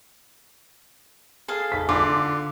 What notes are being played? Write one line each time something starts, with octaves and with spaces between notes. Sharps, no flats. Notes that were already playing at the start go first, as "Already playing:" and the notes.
G#4 A4 F5
B6
D3 F4 D6